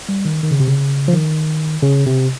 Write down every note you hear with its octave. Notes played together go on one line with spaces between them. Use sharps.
G3
D#3
D#3
C#3
C3
C#3
F3
D#3
C#3
C3